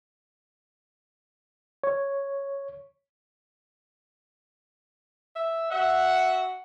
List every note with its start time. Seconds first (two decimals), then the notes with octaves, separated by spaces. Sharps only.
1.84 C#5
5.36 E5
5.72 F#4 E5 F#5